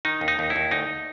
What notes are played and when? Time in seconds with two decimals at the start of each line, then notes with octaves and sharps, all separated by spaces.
0.05 D#3 D#4
0.21 D#2
0.28 D#4
0.39 D#2
0.50 E4
0.56 D#2
0.71 D2 D#4